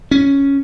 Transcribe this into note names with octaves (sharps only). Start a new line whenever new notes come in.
C#4